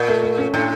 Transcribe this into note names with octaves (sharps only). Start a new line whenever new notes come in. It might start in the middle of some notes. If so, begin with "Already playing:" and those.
Already playing: A#2
A3
A3
C#4
A2 D4